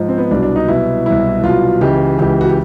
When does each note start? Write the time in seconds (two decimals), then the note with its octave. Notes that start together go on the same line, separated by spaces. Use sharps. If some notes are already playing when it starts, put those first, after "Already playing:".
Already playing: G#2 F3
0.09 C4
0.18 B3
0.31 C2 B2 F#3 D4
0.43 D4
0.56 D#4
0.68 C2 B2 F#3 E4
1.06 C2 B2 F#3 E4
1.43 C2 B2 F#3 F4
1.81 C#2 C#3 E3 G4
2.19 C#2 C#3 E3 G4
2.41 F#4
2.49 G4